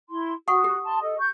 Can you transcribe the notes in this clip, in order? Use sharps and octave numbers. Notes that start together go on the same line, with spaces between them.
E4 C6
F#4 F#5 C#6 D#6
G4
A5 C6
A4 D#5
C#6 G6